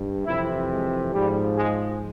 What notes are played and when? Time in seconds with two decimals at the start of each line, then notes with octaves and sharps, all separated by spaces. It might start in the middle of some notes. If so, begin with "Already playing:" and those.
Already playing: G2
0.26 F2 C3 E3 E4
0.70 G#3
1.14 G#2 F3 G3
1.57 G#3